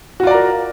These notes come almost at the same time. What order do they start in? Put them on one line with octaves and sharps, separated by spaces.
F#4 F4 D5 A#5 A#4